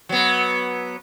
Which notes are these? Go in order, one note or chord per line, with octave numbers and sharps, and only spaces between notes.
F#3 B3